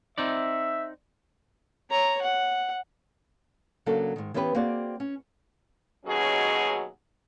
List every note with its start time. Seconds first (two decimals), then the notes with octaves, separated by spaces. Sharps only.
0.18 C4 D#4 D5 E5
1.90 C#5 A#5
2.22 F#5
3.86 C#3 F#3 A#3 D4 A4
4.16 G#2 D#3
4.34 E3 B3 C#4 G4 B4
4.55 A#3 C4 F#4 G#4 D5
5.00 C#4
6.05 D#2 B2 F#3 C#4 G#4 D#5